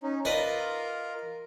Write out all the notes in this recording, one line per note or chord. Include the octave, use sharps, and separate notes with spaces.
C#4 D#4
F4 A#4 B4 D5 D#5